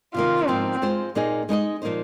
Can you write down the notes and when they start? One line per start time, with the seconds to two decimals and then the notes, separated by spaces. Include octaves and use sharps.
0.14 C3 D#3 A#3 F4
0.48 G#2 F3 A#3 C4
0.82 G#3 F4 C5
1.15 A#2 A#3 D#4 G#4 D#5
1.49 G#3 D#4 A#4 D#5
1.82 A#2 F3 A#3 D#4 C5